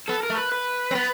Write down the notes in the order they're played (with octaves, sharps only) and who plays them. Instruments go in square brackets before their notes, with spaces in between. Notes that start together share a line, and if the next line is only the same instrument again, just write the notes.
[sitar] B3 [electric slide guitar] A4
[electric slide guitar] A#4
[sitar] A3
[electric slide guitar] B4
B4
[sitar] C4
B3